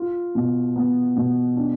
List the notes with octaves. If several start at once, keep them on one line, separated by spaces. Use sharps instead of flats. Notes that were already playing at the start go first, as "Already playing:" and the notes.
Already playing: F4
B2
B3
B2
D4